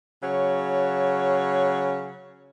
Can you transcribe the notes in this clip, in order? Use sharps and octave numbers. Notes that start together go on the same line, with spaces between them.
C#3 F#3 C#5